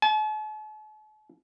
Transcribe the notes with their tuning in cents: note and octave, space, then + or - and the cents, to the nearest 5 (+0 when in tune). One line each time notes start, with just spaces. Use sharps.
A5 -45